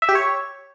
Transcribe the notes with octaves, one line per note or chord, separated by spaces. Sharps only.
E5
G4
C#5